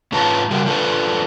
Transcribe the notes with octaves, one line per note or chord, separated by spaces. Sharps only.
G#2 C#4 F4 B4 A5 A#5
C#3 G3 F#4 A#4
F3 G#3 D4 A4 B4